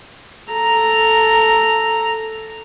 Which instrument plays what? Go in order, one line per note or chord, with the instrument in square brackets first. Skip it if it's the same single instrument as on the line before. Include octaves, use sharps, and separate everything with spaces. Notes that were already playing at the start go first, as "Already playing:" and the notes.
[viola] A4 A#5